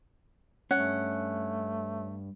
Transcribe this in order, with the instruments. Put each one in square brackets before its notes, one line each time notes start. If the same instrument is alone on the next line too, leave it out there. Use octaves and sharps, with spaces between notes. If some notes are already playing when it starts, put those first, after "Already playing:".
[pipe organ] G2 [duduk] A3 [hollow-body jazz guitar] C#4 [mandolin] F#5